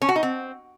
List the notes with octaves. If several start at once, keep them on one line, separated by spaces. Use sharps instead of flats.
C#4
F#4
D#4
C4